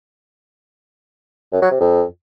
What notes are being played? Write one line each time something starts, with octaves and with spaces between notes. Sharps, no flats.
F#2
F#3
C3
F2